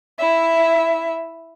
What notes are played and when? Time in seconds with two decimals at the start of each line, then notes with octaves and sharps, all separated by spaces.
0.19 E4 E5